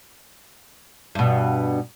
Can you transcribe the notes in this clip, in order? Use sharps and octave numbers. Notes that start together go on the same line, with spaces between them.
G2 B2